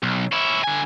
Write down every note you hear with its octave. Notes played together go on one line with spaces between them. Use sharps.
B1
C#4 E4
D3 G#5